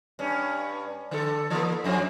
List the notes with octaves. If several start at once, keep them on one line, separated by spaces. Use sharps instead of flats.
G2 C#4
D3 A4
E3 A#3
F2 F3 C#4